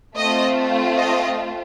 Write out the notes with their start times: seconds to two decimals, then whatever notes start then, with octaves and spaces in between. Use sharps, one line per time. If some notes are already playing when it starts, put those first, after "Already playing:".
0.17 A3 C4 F4 D#5
0.98 D#5